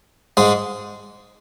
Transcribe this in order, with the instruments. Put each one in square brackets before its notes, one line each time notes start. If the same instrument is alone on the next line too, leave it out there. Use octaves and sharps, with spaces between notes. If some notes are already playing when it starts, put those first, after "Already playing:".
[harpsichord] G#2 G#3